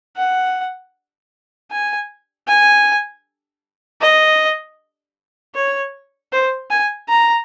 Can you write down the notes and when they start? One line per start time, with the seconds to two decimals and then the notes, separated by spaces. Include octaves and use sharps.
0.17 F#5
1.72 G#5
2.48 G#5
4.01 D#5
5.55 C#5
6.33 C5
6.70 G#5
7.09 A#5